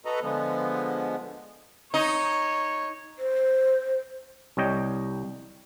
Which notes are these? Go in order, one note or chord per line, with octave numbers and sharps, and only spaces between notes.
F#4 A4 B4 D#5 A#5
D3 F3 G#3 B3
D#4 C#5
C5
C2 G3 C#5 D#5 G5